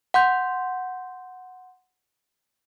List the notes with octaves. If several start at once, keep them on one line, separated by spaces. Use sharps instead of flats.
F#5 C6 G6